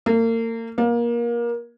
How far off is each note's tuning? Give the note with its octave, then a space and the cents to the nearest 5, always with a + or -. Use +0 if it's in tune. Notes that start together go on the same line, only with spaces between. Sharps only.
A#3 -35
A#3 +25